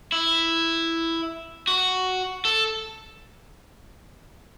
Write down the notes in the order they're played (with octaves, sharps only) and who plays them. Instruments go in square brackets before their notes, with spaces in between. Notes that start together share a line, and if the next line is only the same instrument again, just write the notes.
[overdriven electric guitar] E4
F#4
A4